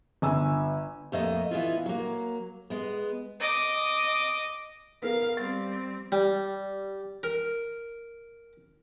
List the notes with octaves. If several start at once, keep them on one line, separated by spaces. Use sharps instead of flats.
G1 G#5 E6
F2 A3 A#3 D#5
E3 B3 E4 F4
F#3 A#3
G#3 B3
D#5 D6
B3 A#4 F5
G3 C4 A6
G3
A#4